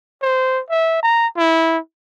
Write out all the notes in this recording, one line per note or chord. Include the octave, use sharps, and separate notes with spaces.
C5
E5
A#5
E4